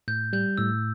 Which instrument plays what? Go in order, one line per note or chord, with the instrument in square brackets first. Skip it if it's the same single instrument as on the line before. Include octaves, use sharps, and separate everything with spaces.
[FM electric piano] A2 [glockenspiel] G6
[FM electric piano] G3 [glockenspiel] G6
[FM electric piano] A2 [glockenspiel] E6